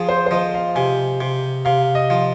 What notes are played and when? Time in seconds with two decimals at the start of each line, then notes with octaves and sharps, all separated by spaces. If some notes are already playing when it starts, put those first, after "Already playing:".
Already playing: F3 G#4
0.09 C5
0.26 C5
0.31 F3 D#5
0.54 F5
0.75 C3 G#5
1.21 C3
1.65 C3 F5
1.95 D#5
2.10 F3